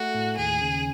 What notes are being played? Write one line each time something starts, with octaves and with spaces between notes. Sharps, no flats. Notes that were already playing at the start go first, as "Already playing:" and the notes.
Already playing: A3 F#4
A2
D#2 G#4
C#3